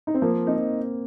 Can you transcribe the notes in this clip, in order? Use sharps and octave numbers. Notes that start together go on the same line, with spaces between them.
D#4
C4
F3 A#3
C4 D#4